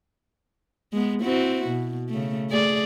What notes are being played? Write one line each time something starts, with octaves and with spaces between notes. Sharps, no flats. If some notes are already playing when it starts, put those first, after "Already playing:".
G#3 B3
C4 E4 F#4
B2
C#3 A3
A3 G#4 D5